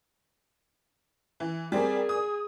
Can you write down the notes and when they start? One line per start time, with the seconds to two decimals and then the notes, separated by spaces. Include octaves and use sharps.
1.40 E3
1.72 G3 C4 G#4 A#4 D5 G#5
2.09 D#6